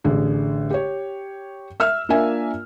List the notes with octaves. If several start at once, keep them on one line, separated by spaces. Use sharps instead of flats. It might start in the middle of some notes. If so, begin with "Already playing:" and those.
A1 D3 G#4
G4 C#5
E5 E6 F6
A#3 D4 F4 A#4 E5 G#5